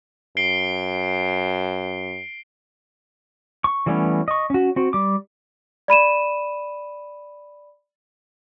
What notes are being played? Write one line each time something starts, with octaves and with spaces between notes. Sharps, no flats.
F#2 C7 D7 G7
C#6
E3 G3 A3 B3 C#4
D#5 C#6
C#4 F#4
C4 F#4
G3 D6
D5 B5 D#7 E7